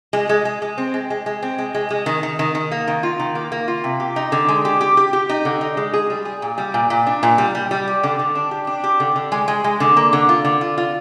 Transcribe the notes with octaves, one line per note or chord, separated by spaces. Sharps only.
G#3
G#3
G#3
G#3
C4
G#3
G#3
G#3
C4
G#3
G#3
G#3
D#3
D#3
D#3
D#3
A#3
D#3
F4
D#3
A#3
A#3
F4
C3
G4
D#4
D3
G#3
G4
G4
G4
G4
D#4
D3
D#4
G#3
G#4
G3
G#4
A#2
G3
A#2
A#2
D4
A#2
G3
G3
G3
G4
D3
D3
D4
G4
D4
G4
D3
D3
G#3
G#3
G#3
D3
A#3
D3
F4
D3
F4
F4